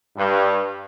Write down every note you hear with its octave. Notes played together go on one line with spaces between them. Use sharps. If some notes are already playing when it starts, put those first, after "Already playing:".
G2